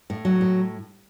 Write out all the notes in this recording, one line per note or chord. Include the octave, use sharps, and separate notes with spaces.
A2
F#3
A2